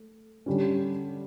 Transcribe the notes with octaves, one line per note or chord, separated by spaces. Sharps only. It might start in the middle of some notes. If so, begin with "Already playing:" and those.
Already playing: A3
D3 G3 C#4